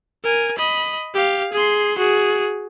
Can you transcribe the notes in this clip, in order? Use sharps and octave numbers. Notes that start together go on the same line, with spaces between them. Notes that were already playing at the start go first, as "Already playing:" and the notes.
A#4 G#5
D#5 B5
G4 F5
G#4 C6
F#4 G#4